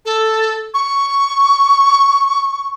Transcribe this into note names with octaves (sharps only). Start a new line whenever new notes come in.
A4
C#6